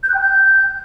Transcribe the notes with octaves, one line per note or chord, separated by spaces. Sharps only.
G6
F#6
G5
G6